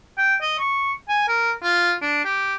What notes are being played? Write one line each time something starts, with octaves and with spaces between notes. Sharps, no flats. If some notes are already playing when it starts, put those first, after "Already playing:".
G5
D#5
C#6
G#5
A#4
F4
D4
G4